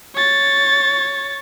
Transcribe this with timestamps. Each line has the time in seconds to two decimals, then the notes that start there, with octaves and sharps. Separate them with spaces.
0.15 C#5 A6